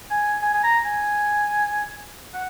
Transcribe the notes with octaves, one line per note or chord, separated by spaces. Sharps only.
G#5
G#5
G#5
A#5
G#5
F#5